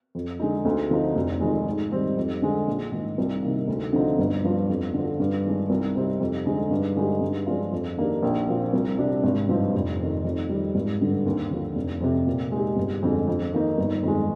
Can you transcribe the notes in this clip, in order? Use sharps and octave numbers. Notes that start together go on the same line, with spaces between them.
F2
D3 G#3 D#4
D2
D3 F3 C4 D#4
F1
F2 D#3 G#3
G#2
D#3 G3 C4 D#4
F2
D3 G#3
A#1
G#2 D#3
C2
C3 D#3 A#3
D2
D3 F3 C4 D#4
G1
G2 F3
F2
D3
F3
G2
D#3 G#3 D4
C2
C3 G3 C4 D#4
F2
D3 G#3 D#4
G2
D3 G#3 D#4 G4
G2
F3 G#3 D4 F4
F2
D#3 A#3 D4 G4
A#1
A#2 F3 C4
C2
C3 G3 D4
G#1
G2 F3 C4 D#4
F1
F2 D#3
F2
D#3 G3
G#1
G2 D3 G3
D#2
D3 F3
F1
F2 C3
A#2
G#3 D#4 G4
G1
F2 D3 G#3
F2
D#3 A#3 D#4
G1
F2 D#3 G#3